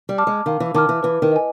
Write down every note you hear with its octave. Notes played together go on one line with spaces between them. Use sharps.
G3
A5 D6 F6
G#3
D#3 F5
E3
D#3 A5 D6 F6
E3
E3 B4
D#3
D#5 G#5